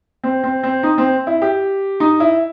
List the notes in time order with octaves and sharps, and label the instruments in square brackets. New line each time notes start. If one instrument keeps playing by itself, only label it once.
[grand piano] C4
C4
C4
D#4
C4
E4
G4
D#4
E4